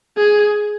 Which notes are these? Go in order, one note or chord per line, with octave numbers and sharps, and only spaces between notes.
G#4